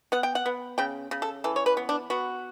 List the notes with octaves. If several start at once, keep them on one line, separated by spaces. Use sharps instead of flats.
B3 F#5
G5
F#5
B3
C#3 G5
C#3
A4
E3 A4
C#5
B4
B3
D4
B3 F#4